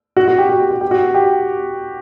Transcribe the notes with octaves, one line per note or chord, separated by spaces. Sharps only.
F#4
F#4
G4
F#4
G4
F#4
G4
F#4
G4